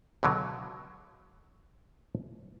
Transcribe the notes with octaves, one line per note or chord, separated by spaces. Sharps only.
C#2 B2 D3 F#3